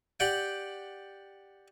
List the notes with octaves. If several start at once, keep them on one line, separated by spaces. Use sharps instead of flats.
G4 D5 F#5 G5